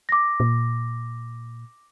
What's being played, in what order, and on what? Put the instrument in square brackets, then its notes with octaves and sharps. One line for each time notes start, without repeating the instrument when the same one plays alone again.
[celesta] D6 A#6
[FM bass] A#2